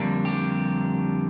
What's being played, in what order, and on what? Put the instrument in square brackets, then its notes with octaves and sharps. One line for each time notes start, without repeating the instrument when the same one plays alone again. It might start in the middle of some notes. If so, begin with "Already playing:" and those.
Already playing: [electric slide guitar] F2 D3 G3 A#3 D4
G4